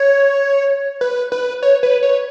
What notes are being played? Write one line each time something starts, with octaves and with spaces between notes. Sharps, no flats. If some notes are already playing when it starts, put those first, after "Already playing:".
Already playing: C#5
B4
B4
C#5
B4
C#5